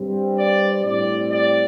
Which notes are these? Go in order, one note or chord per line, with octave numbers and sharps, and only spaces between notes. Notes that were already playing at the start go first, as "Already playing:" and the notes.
Already playing: G2 G3 C4
D5
A2 G3 C4 D5
D5